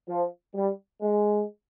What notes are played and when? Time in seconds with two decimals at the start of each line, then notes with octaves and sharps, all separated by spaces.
0.08 F3
0.55 G3
1.01 G#3